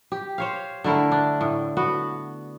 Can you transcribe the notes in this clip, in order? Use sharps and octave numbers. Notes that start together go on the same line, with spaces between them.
G4
C5 C#5 F5
D3 A3 E4 A#4
D4
A2
B3 F#4